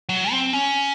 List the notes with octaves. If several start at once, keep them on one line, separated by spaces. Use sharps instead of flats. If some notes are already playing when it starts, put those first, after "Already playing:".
F#3
C4
C#4